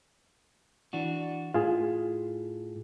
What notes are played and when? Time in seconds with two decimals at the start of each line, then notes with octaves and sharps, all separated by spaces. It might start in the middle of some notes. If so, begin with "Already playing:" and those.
0.93 E3 D4 F#4
1.54 A2 F4 G#4